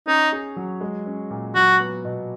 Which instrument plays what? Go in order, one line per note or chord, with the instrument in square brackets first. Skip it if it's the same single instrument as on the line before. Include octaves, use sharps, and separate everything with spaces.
[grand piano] C#4 [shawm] D#4
[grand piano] G#4
F#3
G#3
C#4
A#2
[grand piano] F#3 [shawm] F#4
[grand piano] B3
B2